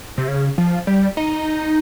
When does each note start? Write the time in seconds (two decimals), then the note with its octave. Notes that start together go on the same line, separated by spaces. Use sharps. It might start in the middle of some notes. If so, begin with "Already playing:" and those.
0.18 C3
0.28 C#3
0.58 F3
0.87 G3
1.17 D#4